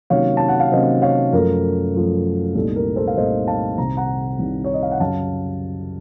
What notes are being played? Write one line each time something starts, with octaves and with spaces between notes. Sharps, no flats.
C3 D#3 F#3 A#3 C#4 C#5 F5
A5
F#5
F5
C3 D#3 F#3 A#3 C#4 C5 D#5
C#5 F5
F#2 F3 A3 A#4
F#2 F3 A3
C2 A#2 A3 D#4 A4
A#4
A4 C5
F5
C2 A#2 A3 D#4 C5 D#5
F5 A5
C2 C3 D#3 A#5
F#5 A#5
C2 C3 D#3
C#5
D#5
F5
F#5
F#2 C#3 F#3 F5 A5